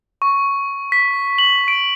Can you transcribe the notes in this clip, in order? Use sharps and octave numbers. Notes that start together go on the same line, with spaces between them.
C#6
B6
F#7
D7